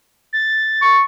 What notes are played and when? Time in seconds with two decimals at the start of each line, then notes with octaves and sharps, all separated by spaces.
0.33 A6
0.82 C#6